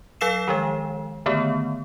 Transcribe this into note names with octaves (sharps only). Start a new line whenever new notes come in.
F#3 A4 F5 E6 C7 E7
D#3 F3 G#3
D3 D#3 A3 B3